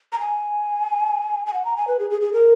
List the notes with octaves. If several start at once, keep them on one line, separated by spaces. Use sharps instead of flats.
A#5
G#5
G#5
F#5
A#5
G#5
B4
G#4
G#4
G#4
A#4